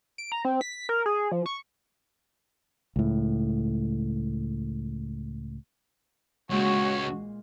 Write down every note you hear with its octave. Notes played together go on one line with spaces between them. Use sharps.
D7
A#5
C4
B6
A#4
G#4
F3
C#6
C#2 A2
C#2 A#2 G#3 F#4 C#5 C6